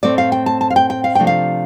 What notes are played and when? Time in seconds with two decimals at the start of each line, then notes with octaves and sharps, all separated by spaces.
0.03 A2 A3 C4 D5
0.18 F5
0.32 G5
0.46 A5
0.61 A5
0.70 F5
0.76 G5
0.90 G5
1.04 F5
1.15 C3 F3 A3 D4 G5
1.27 F5